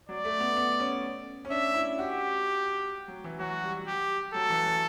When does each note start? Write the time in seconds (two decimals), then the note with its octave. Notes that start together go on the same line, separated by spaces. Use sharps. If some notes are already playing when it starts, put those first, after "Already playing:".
0.09 F#3 D5
0.24 A3
0.40 B3
0.56 B3
0.79 C#4
1.45 C#4
1.50 D4 E5
1.74 E4
1.98 F#4 G4
3.08 F#3
3.24 E3
3.39 F#3 F#4
3.63 G3
3.88 G4
4.34 F#3 A4
4.50 E3
4.66 F#3